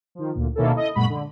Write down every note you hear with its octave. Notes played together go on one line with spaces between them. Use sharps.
D#3 F3
D2 A#2
B2 D#3 A#3 C#4 E4 A4
E4 A4 D#5
F#2 A#2 G#3 F#4 B5
D3